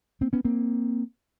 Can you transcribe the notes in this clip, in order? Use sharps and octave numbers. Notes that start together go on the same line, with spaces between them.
A#3 C4
B3 C#4
A#3 C4